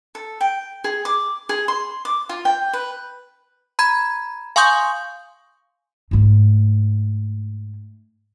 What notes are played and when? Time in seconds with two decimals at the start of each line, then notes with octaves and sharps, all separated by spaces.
0.15 A4
0.41 G5
0.84 G#4
1.05 D6
1.49 G#4
1.68 C6
2.05 D6
2.29 F4
2.45 G5
2.73 B4
3.79 A#5 B5 G#6
4.56 F5 G#5 C6 C#6 D#6 G6
6.11 G#2 A3